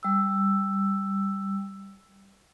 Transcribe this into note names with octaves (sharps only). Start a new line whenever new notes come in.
G3 E6